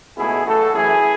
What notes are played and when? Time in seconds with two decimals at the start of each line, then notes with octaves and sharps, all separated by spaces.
0.17 C#2 B2 A3 E4 G#4
0.45 A1 A2 F#3 A3 F#4 A4
0.73 F#2 E3 A3 E4 G#4